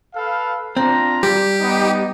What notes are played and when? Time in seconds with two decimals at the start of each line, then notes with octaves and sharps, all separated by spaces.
0.15 A4 B4 F5
0.77 C4 D4 F4 A#5
1.23 G3 G4
1.59 B3 D#4